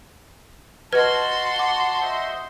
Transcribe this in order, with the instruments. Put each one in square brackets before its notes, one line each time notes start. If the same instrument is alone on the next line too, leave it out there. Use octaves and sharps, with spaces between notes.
[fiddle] F#4 C6 [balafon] B4 [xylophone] D#5 F6 [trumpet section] A5
[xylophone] F#5 D6
[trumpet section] C5 D#5 E5